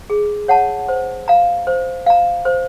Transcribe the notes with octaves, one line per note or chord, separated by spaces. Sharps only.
G#4
C#5 F#5 A5
C5
F5 A#5
C5
F5 A#5
C5